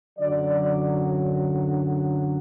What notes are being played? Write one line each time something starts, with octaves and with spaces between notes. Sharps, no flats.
F#2 D3 F#3 D5